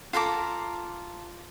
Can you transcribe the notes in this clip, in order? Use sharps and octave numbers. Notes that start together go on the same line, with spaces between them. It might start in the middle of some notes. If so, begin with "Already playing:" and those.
F4 A4 A#5 D6